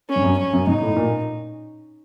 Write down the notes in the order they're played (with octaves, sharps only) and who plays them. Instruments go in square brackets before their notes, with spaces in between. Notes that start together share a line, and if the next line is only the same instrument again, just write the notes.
[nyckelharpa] C#4
[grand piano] G2
F#2
[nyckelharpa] C#4
[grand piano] F#2
[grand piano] G#2 [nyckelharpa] D#4
[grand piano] A2
A#2